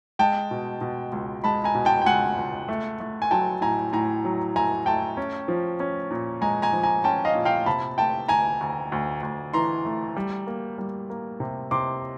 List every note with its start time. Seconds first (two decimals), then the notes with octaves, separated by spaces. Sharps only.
0.19 G#3 G5 A5
0.51 B2
0.81 B2
1.12 C#2
1.44 G#3 A5 B5
1.64 G#5 A#5
1.75 B2
1.85 G5 A5
2.02 G5
2.06 C#2 F#5 G#5
2.37 C#2
2.69 A3
3.00 A3
3.22 G#5
3.31 F#3 G5 A5
3.61 A2 G#5 A#5
3.93 A2 G#5 A#5
4.25 F#3
4.56 A3 G#5 A#5
4.86 A3 G5 A5
5.17 C#4
5.48 F3
5.80 C#4
6.11 A#2
6.42 G#3 G#5 A#5
6.62 G#5 A#5
6.73 F3
6.83 G#5 A#5
7.04 C#4 G5 A5
7.25 D#5 F5
7.35 A#2
7.45 F5 G5
7.66 C3 A5 B5
7.98 A3 G5 A5
8.29 D2 G#5 A#5
8.61 D2
8.92 D2
9.23 D2
9.53 E3 A#5 C6
9.85 A3
10.16 G3
10.47 A#3
10.78 G3
11.10 A#3
11.40 C3
11.71 C3 C6 D6